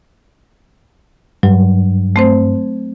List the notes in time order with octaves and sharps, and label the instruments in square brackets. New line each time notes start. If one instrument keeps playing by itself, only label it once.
[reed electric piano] G2 [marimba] F#3
[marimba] A3 C4 C5